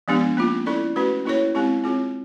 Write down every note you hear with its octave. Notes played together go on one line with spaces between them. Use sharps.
F3 G#3 B3 D4 G4
A#3 C#4 F4
C#4 E4 A4 D5
A3 C#4 F#4 B4
A#3 C#4 E4 A4 C#5
G#3 C4 E4 G4
C4 F4 G#4 C#5